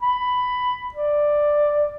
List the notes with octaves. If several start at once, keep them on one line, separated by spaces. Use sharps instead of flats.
B5
D5